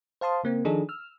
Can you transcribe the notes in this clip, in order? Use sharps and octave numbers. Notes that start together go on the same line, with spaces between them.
C5 F5 A5 C6 D#6
C#3 A#3 C4
D#3 F3 D4 D#4 G#4 A4
E6 F6